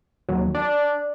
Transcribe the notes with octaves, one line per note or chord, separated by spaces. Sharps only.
D#2 F#3
D4 D5